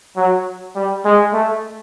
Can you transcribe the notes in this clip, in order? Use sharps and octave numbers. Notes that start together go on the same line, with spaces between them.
F#3
G3
G#3
A3